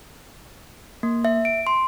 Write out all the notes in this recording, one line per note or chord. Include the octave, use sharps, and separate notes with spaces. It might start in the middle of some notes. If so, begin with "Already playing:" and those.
A#3
E5
D7
C6